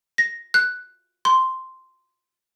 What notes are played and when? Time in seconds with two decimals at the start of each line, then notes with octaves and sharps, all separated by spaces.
0.18 A#6
0.54 F#6
1.25 C6